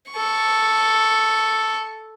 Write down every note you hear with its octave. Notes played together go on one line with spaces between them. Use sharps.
A4 C#6